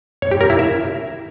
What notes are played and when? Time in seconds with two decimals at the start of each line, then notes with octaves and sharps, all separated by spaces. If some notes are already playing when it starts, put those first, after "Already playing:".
0.22 C#5
0.31 G4
0.41 A#4
0.50 E4
0.59 E5